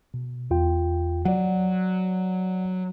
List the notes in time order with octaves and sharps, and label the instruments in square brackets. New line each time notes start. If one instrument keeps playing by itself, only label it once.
[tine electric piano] B2
E2 F4 G5
[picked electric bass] F#3 [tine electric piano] D5 F#5